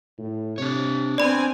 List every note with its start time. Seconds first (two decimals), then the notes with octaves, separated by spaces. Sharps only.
0.18 A2
0.58 C3 D4 C#5
1.18 B3 C4 D5 G#5 B5